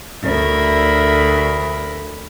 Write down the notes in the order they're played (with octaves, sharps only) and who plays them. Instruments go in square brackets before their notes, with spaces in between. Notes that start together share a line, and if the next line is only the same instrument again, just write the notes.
[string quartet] D2 A#4 E5 B5